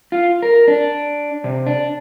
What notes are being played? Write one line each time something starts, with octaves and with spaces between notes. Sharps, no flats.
F4
A#4
D4
C3
D4